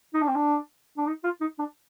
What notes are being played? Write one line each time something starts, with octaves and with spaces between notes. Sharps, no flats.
D#4
D4
C4
D4
D4
D#4
F4
D#4
D4